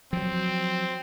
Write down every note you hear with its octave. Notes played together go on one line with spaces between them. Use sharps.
F3 F#3 C4